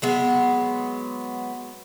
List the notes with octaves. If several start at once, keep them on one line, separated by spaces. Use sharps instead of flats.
F#3 G#3 B3